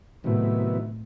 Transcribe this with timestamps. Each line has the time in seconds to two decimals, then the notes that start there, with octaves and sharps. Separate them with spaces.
0.24 A2 C3 D#3 F#3 B3 E4